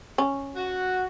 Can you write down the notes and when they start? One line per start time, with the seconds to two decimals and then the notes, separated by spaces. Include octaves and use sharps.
0.18 C#4
0.55 F#4